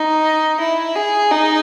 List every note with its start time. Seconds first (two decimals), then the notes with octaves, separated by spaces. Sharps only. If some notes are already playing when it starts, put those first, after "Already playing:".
Already playing: D#4
0.60 E4
0.96 G#4
1.32 D#4